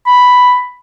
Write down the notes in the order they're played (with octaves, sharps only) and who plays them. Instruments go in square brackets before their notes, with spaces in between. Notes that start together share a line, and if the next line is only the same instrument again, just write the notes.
[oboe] B5